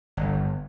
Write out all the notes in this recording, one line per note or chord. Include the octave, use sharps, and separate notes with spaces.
G1